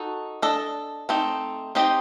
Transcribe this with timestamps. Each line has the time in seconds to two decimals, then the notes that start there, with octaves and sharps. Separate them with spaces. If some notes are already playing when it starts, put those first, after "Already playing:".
Already playing: D#4 F#4 A4
0.42 D4 A4 D#5
1.09 A3 C4 D#4
1.75 C4 D#4 G4 C5 D#5